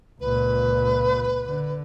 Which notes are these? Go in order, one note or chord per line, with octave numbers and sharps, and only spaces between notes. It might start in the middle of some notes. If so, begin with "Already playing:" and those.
C#2 A#2 B4
D3